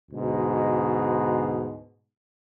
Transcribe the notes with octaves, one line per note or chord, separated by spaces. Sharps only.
D2 G#2 B2